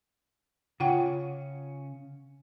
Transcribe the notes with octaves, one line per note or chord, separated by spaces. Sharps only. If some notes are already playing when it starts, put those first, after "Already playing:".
C#3 C#4 F4 F#5 G5